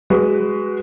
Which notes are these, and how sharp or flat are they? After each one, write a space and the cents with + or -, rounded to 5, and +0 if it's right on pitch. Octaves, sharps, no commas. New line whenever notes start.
G#3 +0 F#4 +15 B4 +0